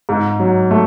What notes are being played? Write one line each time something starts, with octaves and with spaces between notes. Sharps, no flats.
G#2
F#3
A3